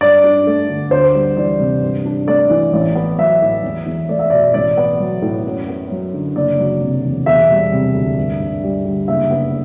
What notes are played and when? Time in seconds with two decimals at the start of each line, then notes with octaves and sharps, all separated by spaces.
0.01 G2 D5
0.24 D4
0.47 A3
0.69 D3
0.91 D2 C5
1.15 G3
1.36 E3 D5
1.59 C3
1.82 G2
2.06 D4
2.27 A3 D5
2.50 E3
2.73 A1
2.95 B3
3.18 F#3 E5
3.41 A2
3.64 E2
3.86 E2
4.09 A3 D5
4.19 E5
4.30 B2 D5
4.54 A1 D5
4.77 B3
5.00 F#3
5.22 A2
5.46 F#2
5.68 B3
5.91 F#3
6.13 D3
6.35 F#1 D5
6.59 F#3
6.81 C3
7.04 E2
7.26 E1 E5
7.50 G3
7.72 C3
7.94 D2
8.17 G2
8.40 G2
8.63 G3
8.85 D3
9.08 F#1 E5
9.31 B3